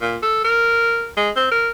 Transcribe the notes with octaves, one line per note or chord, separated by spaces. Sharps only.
A#2
A4
A#4
G#3
C4
A#4